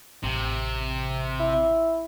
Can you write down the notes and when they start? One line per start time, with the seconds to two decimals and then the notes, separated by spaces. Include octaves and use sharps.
0.24 A1 C3
1.40 E4